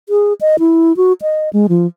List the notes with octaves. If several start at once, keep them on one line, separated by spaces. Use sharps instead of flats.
G#4
D#5
E4
F#4
D#5
G#3
F3